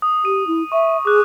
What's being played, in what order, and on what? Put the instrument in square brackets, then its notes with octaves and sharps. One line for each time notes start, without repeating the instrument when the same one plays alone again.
[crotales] D#6
[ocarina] G4 [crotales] D#7
[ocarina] E4
[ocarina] E5 [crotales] C#6
[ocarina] G#4 [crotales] D6 F#6